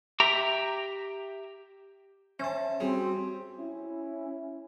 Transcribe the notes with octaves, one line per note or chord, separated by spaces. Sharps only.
G4 E5 G5 A#5
C#4 C5 E5 A5
G3 C4 F#4 G#4
C#4 E4